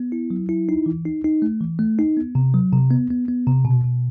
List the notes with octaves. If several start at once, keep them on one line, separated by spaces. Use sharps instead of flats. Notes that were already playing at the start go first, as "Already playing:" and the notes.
Already playing: B3
E4
F#3
E4
D#4
E3
D#4
D#4
A3
E3
A3
D#4
B3
C3
F#3
C3
B3
B3
B3
C3
B2
B2